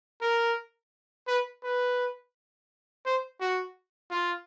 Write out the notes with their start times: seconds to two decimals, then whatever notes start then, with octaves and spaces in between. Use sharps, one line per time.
0.22 A#4
1.28 B4
1.64 B4
3.06 C5
3.41 F#4
4.11 F4